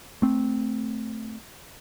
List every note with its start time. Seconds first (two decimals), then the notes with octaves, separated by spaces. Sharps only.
0.22 A3 C4